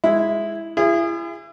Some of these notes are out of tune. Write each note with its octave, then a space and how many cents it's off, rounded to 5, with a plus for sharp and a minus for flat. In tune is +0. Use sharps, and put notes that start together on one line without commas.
G#3 -5 E4 +0
E4 +40 G#4 -25